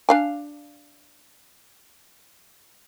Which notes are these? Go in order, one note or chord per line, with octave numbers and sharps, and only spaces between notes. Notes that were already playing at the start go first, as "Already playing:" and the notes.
D4 F5 G#5